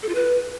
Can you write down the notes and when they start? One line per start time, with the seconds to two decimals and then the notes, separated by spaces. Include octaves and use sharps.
0.03 A4
0.09 F4
0.15 B4